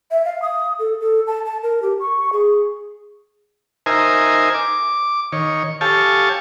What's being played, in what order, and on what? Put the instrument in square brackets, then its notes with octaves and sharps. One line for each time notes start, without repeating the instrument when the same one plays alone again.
[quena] E5
F5
D#6
A4
A4
A5
A5
A#4
G4
C#6
G#4
[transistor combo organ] D#4 A#4 C5 E5 G#5
D6
D#3 C#5
G4 A4 C#5 F5 G#5 A5